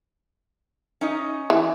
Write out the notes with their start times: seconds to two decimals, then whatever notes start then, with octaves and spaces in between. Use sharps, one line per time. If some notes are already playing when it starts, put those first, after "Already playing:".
1.01 C#4 D#4 D#5
1.50 E3